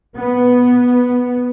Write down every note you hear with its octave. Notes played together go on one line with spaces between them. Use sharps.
B3